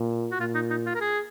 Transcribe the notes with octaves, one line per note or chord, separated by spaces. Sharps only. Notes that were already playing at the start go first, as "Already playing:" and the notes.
Already playing: A#2
F#4
A#2 F4
D#4
D#4
F4
A#4
G#4